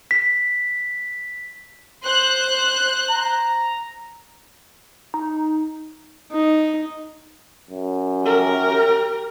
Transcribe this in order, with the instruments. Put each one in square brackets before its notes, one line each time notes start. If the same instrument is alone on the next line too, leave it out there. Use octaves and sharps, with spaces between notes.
[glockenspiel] B6
[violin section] C5 F#6
[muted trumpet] A#5
[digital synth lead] D#4
[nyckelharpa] D#4
[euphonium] F#2
[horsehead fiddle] G4 A#4